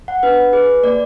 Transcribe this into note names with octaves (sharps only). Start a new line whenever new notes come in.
F#5
D4 B4
G#4 B4
A#3 D5